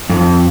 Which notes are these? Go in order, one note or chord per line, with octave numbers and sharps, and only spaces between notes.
F2